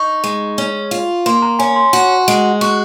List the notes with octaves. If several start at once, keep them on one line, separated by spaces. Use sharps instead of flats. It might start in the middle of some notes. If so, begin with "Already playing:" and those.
Already playing: D#4 C#6
G#3
C#4
F4
A#3 C6
A#5
C#4 G#5
C6
F#4
G#3
F#4 C#6